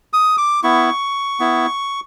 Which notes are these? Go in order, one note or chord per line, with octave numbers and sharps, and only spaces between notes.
D#6
D6
B3 E4 C#6
B3 E4